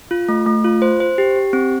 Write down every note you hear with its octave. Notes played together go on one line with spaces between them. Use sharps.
F4
A3
A3
F4
C5
C5
G4
G4
C4